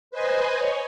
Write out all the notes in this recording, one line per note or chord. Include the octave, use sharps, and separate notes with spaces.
B4 C5 D#5 G#5
C#5